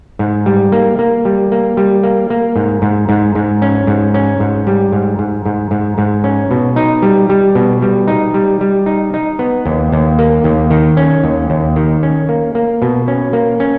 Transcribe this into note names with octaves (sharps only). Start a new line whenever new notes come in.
G#2
G3
A#3
A#3
G3
A#3
G3
A#3
A#3
G#2
G#2
G#2
G#2
C#4
G#2
C#4
G#2
G3
G#2
G#2
G#2
G#2
G#2
C#4
B2
D#4
G3
G3
B2
G3
D#4
G3
G3
D#4
D#4
B3
D#2
D#2
A#3
D#2
D#3
C#4
D#2
D#2
D#3
C#4
A#3
A#3
B2
C#4
A#3
C#4